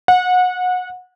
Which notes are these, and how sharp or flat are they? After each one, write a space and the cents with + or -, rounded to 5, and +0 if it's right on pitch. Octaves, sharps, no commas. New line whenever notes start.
F#5 -25